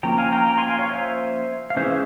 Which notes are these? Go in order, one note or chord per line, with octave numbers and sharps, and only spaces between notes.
F3 A#3 C#4 G5 A#5
F5 G#5
G5 A#5
G5 A#5
G#5 C6
F5 G#5
C#5 F5
C5 E5
F5
E3 G#3 C#4 C5 E5